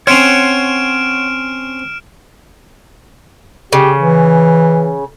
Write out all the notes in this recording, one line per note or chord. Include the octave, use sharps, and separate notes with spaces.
C4 C#4 C#5 F#5 C6 F6 D7 E7
C#3 G4
E3